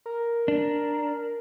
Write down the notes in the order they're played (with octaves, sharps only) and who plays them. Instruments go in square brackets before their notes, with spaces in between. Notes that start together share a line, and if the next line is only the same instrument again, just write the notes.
[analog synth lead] A#4
[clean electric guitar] D4